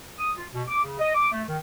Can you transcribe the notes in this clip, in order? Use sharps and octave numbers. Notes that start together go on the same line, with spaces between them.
D#6
F4
B2
D6
C#3
D#5
D6
A3
D#3